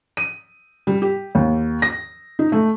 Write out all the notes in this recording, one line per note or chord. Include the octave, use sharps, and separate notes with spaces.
D#7
G3
G4
D#2
A#6
D#4
A3